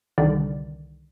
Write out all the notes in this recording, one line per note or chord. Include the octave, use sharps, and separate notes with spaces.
C2 D3 D#3 G3 D5